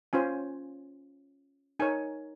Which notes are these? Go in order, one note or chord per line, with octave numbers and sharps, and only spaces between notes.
C#4 F4 C5 G#5
D#4 A#4 C#5 G#5